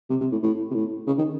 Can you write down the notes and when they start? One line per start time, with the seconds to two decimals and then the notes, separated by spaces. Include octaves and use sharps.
0.10 C3
0.21 C3
0.32 A2
0.43 A2
0.71 C3
0.74 A2
1.07 C#3
1.18 D#3